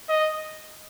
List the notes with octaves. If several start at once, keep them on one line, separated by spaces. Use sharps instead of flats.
D#5